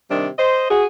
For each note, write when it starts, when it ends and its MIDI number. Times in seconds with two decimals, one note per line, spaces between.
0.11 0.29 48
0.11 0.29 51
0.11 0.29 55
0.11 0.29 62
0.39 0.66 72
0.39 0.66 75
0.71 0.86 66
0.71 0.86 68